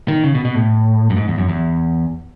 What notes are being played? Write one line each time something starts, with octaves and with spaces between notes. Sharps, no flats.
D#3
C#3
B2
B2
A2
F#2
G#2
E2
F#2
E2